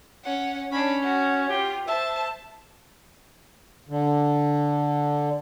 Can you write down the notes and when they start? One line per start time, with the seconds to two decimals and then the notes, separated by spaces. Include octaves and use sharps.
0.24 C#4 F#5
0.72 C#4 D4 B5
1.03 F#4
1.49 F4 G4
1.88 C5 E5 A5
3.89 D3